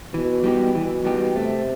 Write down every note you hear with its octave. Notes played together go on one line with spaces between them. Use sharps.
B2 E3
G3 B3 D#4 G4
B2 E3
G3 B3 D#4 G4
C3 A3